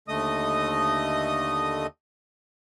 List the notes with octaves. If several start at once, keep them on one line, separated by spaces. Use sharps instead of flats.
D#2 D3 A3 D#5 D#6